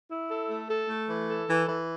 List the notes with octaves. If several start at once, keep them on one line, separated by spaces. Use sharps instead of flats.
E4
A4
A3
A4
A3
E3
A4
E3
E3